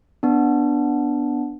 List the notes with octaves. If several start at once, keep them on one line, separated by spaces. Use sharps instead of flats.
B3 D4